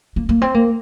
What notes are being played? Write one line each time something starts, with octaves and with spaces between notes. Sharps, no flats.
A#3
A#3
C4
A#3